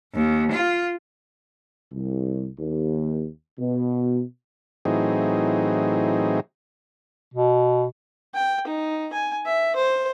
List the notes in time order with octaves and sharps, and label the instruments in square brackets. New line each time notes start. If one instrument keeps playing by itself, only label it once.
[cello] D#2
F4
[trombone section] C2
D#2
B2
[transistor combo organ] A2 E3 F#3 C4 D#4 G#4
[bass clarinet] B2
[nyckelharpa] G5
D#4
G#5
E5
C5